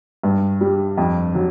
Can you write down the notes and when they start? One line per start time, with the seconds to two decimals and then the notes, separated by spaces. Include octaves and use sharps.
0.23 G2
0.61 G3
0.97 F2
1.35 F#3